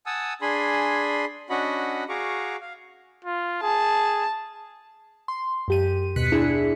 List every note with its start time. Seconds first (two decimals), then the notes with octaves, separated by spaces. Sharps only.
0.06 F#5 G#5 A5 D#6 E6
0.42 D4 G#4 G#5 B5 C6
1.50 C#4 D4 F#4 D#5 F#5 B5
2.09 F#4 G#4 F5 A#5 C#6 D6
2.61 F5
3.25 F4
3.62 G#4 A5
5.28 C6
5.68 F#2 G4 D#7
6.16 D#2 B2 F#6 B6 C#7
6.32 D4 E4 G#4